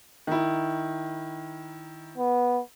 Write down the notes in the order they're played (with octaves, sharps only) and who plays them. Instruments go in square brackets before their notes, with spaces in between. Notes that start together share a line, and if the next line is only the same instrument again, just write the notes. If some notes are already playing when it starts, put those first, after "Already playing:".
[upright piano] D#3 E4
[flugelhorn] B3